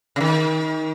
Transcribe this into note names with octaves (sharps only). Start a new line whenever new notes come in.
C#3
D#3